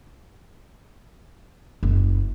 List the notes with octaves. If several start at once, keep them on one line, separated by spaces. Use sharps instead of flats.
F#1